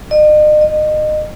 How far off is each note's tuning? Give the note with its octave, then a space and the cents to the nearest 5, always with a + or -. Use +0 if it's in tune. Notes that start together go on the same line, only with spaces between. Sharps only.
D#5 -45
D#5 -25